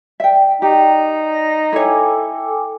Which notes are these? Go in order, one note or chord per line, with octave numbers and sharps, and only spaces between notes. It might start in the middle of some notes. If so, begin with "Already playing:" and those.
D5 E5 G5
D#4 G4
A#6
E4 A4 C#5 G5 G#5 D6